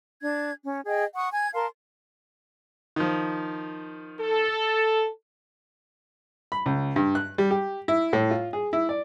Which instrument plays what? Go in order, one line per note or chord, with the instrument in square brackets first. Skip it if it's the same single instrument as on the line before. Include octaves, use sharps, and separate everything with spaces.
[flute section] D4 G#6
C#4
G#4 D#5 G5
F#5 C#6 D#6
G#5 G#6
A#4 F5 A5 C6
[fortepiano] D#3 F3
[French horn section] A4
[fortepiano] B5
C#2
G2
F#6
G3
G4
E4
A2
F4
G#4
E4
D5